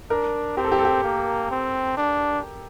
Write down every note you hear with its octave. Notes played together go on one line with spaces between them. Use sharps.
D4 A#4
C4 G4
A4
G4
A4
G4
A#3
C4
D4